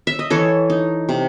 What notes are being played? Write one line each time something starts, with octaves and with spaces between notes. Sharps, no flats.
E5
D#5
E3 A4 C#5
D#4
C3